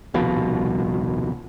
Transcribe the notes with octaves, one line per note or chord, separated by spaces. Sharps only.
D#1 C2 B2 F3